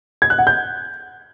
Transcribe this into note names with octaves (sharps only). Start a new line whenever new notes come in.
G#6
F#6
F#5
G6